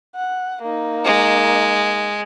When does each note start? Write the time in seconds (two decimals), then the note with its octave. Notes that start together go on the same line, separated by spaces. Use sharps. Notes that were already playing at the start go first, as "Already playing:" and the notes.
0.15 F#5
0.62 A#3 D#4
1.05 G#3